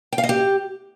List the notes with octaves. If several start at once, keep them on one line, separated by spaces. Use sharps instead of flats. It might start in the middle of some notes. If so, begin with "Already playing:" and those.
G5
F5
D#5
G4